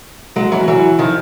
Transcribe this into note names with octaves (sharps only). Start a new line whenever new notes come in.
F#3 G#3
E3 F#3
E3 F#3
D#3 F3